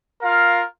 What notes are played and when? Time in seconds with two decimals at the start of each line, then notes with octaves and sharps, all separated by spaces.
0.21 F4 A#4 F5